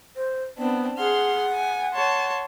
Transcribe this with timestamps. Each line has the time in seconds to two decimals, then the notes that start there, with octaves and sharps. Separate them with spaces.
0.16 C5
0.58 B3 C4 D4
0.98 G#4 F#5 C6 F6
1.54 G#5
1.93 C#5 A5 C6